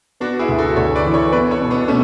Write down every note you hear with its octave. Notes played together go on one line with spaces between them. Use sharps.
B3 D4 F#4
E4 G#4
D2
F#4 A4
D2 A4 C#5
B4 D5
E3
A4 C#5
B3 B4 D5
A4 C#5
B2
B3 D4
B2 A3 C#4